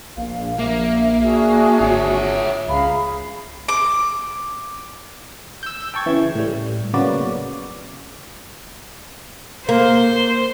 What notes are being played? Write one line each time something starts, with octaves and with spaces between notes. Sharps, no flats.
A#1 F5
A#3 E5
D4 F#4 G#4
G#1 F4 C#5
C#2 G#4 F5 A#5 B5
D6
E6 G6
G5 A5 C#6 G#6
C#3 E3
A2 G3
C#3 F#3 A#3 B3 F#4 D5
A#3 C5